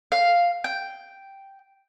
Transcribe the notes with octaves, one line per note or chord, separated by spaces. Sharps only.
F5
G5